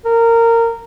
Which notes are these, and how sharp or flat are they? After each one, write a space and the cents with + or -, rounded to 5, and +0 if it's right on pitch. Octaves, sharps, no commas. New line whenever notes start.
A#4 -15